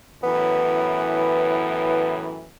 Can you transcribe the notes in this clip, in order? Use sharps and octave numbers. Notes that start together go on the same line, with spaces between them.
F#2 A2 E3 B3